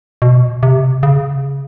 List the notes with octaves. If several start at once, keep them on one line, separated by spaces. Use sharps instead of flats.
B2
C3
C#3